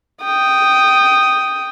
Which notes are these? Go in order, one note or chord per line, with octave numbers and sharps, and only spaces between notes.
G5 D#6